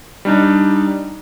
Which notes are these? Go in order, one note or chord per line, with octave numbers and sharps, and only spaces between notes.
G3 D4 D#4